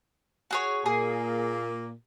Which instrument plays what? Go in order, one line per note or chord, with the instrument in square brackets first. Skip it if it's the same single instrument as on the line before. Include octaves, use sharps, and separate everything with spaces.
[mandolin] F#4 G#4 C#5
[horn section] A#2 A#3 [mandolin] G#4